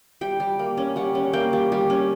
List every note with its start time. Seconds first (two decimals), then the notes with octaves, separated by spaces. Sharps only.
0.21 G3 G5
0.40 G3
0.59 A#3
0.77 C#4
0.96 G3 F#5
1.15 C#4
1.33 A#3 G5
1.53 G3
1.72 G3
1.90 C#4